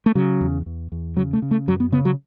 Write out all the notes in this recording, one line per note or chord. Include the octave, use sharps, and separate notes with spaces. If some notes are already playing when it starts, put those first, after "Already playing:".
A3
C#3 F#3
E2
E2
E2
C#3 F#3
A3
C#3
A3
F#2 F#3
B3
C#3 B3
F#3